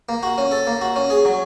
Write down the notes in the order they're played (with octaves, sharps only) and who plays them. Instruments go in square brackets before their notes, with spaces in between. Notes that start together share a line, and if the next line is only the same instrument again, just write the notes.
[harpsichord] A#3
F#4
C#4
A4
A#3
F#4
C#4
G#4
F#3